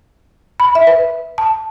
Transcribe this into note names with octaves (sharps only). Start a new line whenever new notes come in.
B5
E5
B4
A5